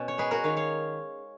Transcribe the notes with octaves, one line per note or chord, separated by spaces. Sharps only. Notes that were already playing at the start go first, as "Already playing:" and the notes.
Already playing: B2 C#4
C#5
G#3 G#4 B4
F#4 A#4
D#3 C#5 F5
C#5 F5